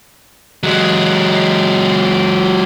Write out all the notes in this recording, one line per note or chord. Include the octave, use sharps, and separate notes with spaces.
F#3 G#3